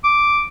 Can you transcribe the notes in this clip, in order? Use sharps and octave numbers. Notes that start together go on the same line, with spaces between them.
D6